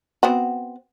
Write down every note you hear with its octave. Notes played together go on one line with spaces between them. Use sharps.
B3 C4 F#4